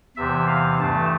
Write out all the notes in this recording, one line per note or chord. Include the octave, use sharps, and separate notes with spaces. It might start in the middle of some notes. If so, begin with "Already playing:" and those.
E2 C3 E3 E5
F5
G2 E3 A3 A5